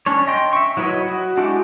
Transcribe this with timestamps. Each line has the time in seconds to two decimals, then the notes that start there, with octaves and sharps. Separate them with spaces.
0.06 C#4 D4 C#5
0.27 D#5 G5 C6
0.53 E5 C#6
0.77 F#3 E4 B4 C#5 D#5
1.08 F#4
1.37 G#3 D4 E4 F#4 G4